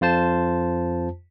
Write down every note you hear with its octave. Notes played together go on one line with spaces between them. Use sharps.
F2 F4 C5 A5